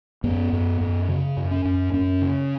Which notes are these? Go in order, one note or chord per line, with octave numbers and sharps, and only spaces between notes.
F#2 B3
F#2
F#2
C#3
F#2
C#4
F#2
F#2 C#4
C#3